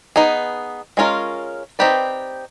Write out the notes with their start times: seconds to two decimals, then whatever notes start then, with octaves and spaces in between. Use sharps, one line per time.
0.16 B3 D#4 G#4
0.97 G#3 C#4 F4 A#4
1.79 C4 D#4 G4 B4 D5